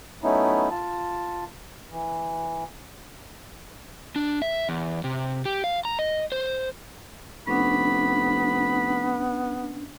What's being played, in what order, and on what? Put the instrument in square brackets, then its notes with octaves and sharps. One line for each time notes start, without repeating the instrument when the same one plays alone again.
[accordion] F#3 A3 B3 C#4 D#4 E4
F4 A5
E3
[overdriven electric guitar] D4
E5
E2
C3
G4
F5
A#5
D#5
C5
[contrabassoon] F1 [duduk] B3 [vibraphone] C#4 D4 [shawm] B5